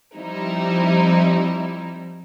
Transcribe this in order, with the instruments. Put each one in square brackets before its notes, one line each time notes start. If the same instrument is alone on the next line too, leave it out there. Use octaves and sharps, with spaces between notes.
[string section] F3 G3 C4 D#4 E4